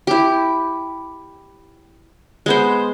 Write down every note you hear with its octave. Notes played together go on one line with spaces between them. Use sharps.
E4 G4
G#3 B3 C5